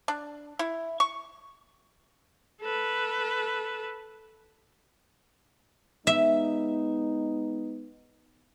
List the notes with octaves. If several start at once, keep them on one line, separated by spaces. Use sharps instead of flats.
D4
E4
C#6
A4 B4
G#3 B3 D#4 E5